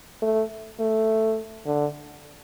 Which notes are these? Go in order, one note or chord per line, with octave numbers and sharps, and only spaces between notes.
A3
A3
D3